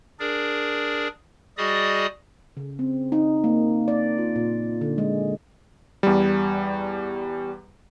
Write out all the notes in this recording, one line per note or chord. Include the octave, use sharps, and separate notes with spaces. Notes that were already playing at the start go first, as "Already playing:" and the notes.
D4 G#4 A#4 D5
G3 F#4 G#4 D5 D#5 D#6
C#3
C4
D#4
A#3
D5
F4
A#2
D3
G#3
E2 G3